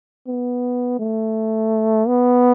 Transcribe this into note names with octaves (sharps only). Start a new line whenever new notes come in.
B3
A3
B3